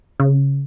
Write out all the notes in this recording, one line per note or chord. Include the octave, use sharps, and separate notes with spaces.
C#3